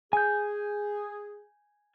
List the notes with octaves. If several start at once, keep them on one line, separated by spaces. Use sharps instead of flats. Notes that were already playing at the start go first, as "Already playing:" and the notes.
G#4 G#5 G6